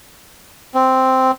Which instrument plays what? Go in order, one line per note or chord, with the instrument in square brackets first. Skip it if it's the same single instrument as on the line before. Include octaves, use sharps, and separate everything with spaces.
[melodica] C4